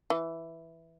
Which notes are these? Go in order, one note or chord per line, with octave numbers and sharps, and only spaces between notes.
E3